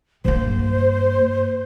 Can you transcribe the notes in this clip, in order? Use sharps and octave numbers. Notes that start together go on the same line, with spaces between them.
G2 A#3 C5